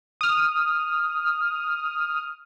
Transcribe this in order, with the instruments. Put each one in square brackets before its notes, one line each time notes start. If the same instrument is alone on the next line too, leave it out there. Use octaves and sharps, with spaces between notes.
[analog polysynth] D#6 F6